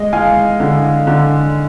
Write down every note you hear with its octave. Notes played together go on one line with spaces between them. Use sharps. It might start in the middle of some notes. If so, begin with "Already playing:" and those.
Already playing: G#3 D#5
G#3 F5 G#5
D3
D3